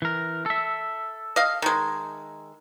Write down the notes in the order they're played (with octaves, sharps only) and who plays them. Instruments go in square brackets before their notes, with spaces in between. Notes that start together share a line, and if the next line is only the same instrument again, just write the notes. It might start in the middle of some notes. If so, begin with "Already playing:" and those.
[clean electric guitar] E3 A#4
A4 E5
[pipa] D#5 F5
D#3 G#3